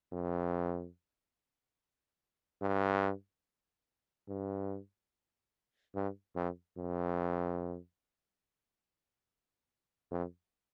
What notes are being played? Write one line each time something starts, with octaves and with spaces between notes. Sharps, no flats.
F2
G2
G2
G2
F2
F2
F2